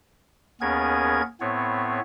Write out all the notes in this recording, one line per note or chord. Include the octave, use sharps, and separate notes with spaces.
D#2 B3 C#4 G#4 A#4 G#6
A2 B3 C4 C#5